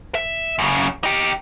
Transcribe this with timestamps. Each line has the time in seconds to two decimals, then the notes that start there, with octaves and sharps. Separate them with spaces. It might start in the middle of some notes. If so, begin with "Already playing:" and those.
0.15 E5
0.59 F#2 C#3
1.04 D#4 G4